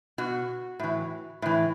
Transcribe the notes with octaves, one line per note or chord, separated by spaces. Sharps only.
B2 F#4
A2 E3
A2 E3